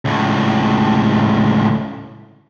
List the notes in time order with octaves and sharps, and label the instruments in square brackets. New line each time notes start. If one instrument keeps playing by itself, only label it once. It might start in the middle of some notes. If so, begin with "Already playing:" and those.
[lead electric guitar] C#2 A2